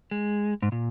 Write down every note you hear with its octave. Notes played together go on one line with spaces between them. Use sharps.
G#3
G#2
A#2